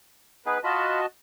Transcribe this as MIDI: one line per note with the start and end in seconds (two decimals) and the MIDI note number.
0.46 0.58 59
0.46 0.58 63
0.46 0.58 68
0.46 0.60 71
0.64 1.00 65
0.64 1.06 66
0.64 1.06 75
0.64 1.06 81
0.64 1.00 83